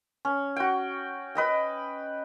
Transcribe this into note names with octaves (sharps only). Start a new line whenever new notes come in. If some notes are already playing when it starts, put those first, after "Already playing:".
C#4
F#4 G5
B4 D#5 G5